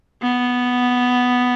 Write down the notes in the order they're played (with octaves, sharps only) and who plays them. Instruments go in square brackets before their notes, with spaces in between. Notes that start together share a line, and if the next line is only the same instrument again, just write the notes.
[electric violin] B3